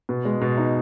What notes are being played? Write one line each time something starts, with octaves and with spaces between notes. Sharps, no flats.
B2
G#3
B2
D#4